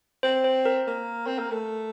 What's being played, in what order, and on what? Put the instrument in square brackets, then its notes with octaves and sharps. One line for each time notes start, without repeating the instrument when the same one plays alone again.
[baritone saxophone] C4 [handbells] C5
[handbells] C5
A#4
[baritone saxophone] A#3
C4
A#3
A3